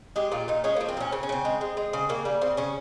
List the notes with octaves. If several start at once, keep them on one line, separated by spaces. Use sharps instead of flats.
G#3 G4
A#2 F4
A#2 D#4
G#3 C#4
F3 A#3
C4
A#2 C#4
C#3 C4
C#4
C#3 C4
G#3
G#3
G#3
C#3
C#3 A#3
G3 A#3
C#3 C4
C#3 C#4